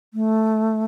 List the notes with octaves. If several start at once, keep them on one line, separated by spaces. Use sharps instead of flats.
A3